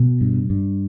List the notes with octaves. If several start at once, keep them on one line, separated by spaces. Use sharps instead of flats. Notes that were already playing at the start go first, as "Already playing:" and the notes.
Already playing: B2
G2
G2